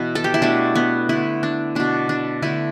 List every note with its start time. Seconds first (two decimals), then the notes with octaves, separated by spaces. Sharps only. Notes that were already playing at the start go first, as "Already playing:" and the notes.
Already playing: B2 E3 B3
0.15 A4
0.24 G4
0.34 E4
0.42 B2 A3 D4
0.75 B3
1.09 D3 A3 E4
1.43 D4
1.75 B2 B3 D4
2.09 D4
2.42 D3 A3 E4